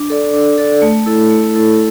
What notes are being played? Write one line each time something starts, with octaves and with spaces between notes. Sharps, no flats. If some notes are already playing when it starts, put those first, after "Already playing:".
Already playing: D4
A4 D5
D4
A4 D5
A3
E4 A4
A3
E4 A4